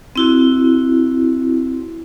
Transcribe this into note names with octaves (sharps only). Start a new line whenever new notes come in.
C4 E4 F#4